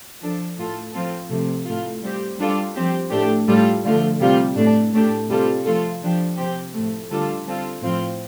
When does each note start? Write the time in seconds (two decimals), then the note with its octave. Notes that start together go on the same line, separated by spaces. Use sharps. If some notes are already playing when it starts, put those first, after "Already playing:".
0.21 F3 D4 A4
0.57 A2 A3 F4 A4
0.93 F3 C4 F4 A4
1.29 C3 F3 A3
1.66 A2 A3 F4
2.02 G3 C4 G4
2.38 G3 D4 F4 A4
2.75 F3 C4 G4
3.11 A2 A3 D4 G4
3.48 A2 G3 F4 A4
3.84 D3 F3 A3 F4
4.20 C3 G3 F4
4.56 A2 A3 D4
4.93 A2 A3 D4 G4
5.29 C3 G3 F4 A4
5.65 F3 A3 F4 A4
6.02 F3 D4 G4
6.38 C3 F3 C4 G4
6.74 A2 F3 A3
7.10 D3 G3 D4 F4 A4
7.46 G3 C4 F4 A4
7.83 A2 F3 C4 F4